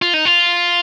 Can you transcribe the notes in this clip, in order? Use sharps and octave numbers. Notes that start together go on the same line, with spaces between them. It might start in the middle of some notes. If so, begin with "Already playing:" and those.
F4
D#4
F4